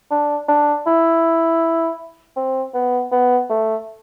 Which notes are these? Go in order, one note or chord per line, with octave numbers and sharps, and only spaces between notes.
D4
D4
E4
C4
B3
B3
A3